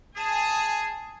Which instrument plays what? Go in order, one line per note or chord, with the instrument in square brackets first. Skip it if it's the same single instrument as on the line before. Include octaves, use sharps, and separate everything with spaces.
[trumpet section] G#4 [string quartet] G#5 A5 D#6